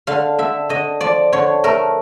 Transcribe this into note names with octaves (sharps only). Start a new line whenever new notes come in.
D3 F5
D3 E5
D3 D#5
F3 D5
D3 C#5
A3 A#4